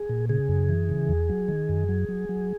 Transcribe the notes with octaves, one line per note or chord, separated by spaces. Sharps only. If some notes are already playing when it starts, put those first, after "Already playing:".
Already playing: G#4
A#2
C#3 G#4
F#2
E3
C#3
E2
F#3
D#3
F#2
F#3
F#3
F#3